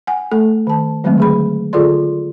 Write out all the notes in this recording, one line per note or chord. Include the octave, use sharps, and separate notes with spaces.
F#5 G#5
A3 A4
D#3 A5
D#3 F#3 G#3 A3 C4
D3 G#4 B5
D3 F4 G#4 A4 D5 C6